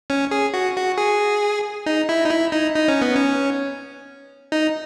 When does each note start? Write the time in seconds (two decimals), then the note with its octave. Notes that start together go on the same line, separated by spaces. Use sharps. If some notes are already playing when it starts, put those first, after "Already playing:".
0.10 C#4
0.31 G#4
0.54 F#4
0.76 F#4
0.98 G#4
1.86 D#4
2.09 E4
2.25 D#4
2.30 E4
2.52 D#4
2.75 D#4
2.88 C#4
3.01 B3
3.16 C#4
4.52 D#4